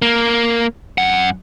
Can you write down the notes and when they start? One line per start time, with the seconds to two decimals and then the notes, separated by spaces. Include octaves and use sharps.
0.02 A#3
0.98 F#2 F#5